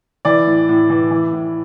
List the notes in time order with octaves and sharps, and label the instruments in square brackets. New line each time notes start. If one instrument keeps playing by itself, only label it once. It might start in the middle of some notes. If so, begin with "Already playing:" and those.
[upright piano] E3 D5
A2
A2
E3
E3
A2